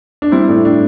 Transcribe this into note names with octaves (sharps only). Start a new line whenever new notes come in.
D4
G3 C4 E4
A2
A2 D4